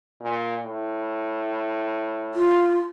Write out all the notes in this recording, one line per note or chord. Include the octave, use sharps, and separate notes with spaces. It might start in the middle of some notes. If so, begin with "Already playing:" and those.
A#2
A2
F4